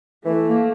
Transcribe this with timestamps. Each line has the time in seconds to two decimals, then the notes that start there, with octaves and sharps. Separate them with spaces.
0.25 E3 A3
0.46 A#3